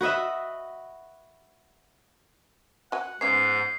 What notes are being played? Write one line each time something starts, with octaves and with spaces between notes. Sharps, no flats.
F#4 B4 D#5 E5
F#4 F#5 G#5
G#2 G#3 B3 C#4 C7